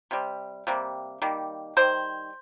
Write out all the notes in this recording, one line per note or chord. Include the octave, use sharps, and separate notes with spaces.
C3 G3
C3 G3 A#3
D#3 G3 A#3
D#3 G3 C5